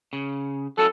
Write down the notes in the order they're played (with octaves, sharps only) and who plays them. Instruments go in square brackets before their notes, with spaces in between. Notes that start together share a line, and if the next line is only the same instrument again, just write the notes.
[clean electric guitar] C#3
[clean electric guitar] F#3 C#4 E4 [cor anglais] A4